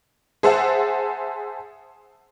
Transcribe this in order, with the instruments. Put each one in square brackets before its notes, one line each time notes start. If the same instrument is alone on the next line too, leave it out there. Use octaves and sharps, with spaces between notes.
[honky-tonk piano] G#4 C5 E5 F#5 A5